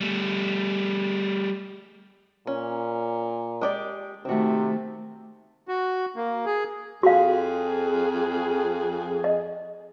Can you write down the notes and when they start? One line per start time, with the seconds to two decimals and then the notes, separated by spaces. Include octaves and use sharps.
0.01 G3 A3
2.47 A#2 C#4
3.61 G#3 G4 D5
4.25 C3 D#3 A3 C4 F#4
5.68 F#4
6.16 A#3
6.46 G#4
7.03 F2 F#4 G#4 F5
9.24 D#5